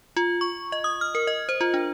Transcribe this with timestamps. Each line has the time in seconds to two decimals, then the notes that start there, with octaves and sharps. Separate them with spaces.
0.17 F4
0.41 C#6
0.72 D#5
0.84 D#6
1.01 F6
1.15 A#4
1.27 D#5
1.49 C5
1.61 F4
1.74 D4